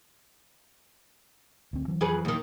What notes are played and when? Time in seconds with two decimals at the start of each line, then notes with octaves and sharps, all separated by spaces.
1.73 D2 C4
1.88 E3 F#3
2.01 F2 G#4 B4
2.25 D#2 D#3